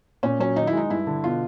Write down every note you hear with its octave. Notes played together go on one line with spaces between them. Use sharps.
A#2 C#4
F#3 C#4
D#3 D#4
E4
G#3 D#4
G2 E4
D3
B2 F4